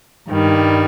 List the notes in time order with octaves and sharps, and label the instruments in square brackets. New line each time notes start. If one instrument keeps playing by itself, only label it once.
[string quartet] G2 D#3 G3